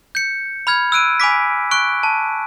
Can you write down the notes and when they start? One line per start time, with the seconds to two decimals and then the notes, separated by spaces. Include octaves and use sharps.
0.15 G6 C#7
0.67 B5 F6 G#6
0.92 E6 F#6 D7 D#7
1.20 G#5 B5 D6 B6
1.71 C#6 F#6 D7
2.03 A5